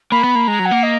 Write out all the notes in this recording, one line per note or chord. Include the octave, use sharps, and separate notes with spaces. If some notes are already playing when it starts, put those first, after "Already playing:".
A#3 B5
B3
A#3
G#3 A#5
F#3
F#5
A#3
D#5